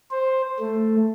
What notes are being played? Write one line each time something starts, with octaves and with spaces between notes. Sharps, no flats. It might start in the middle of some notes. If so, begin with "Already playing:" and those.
C5
A3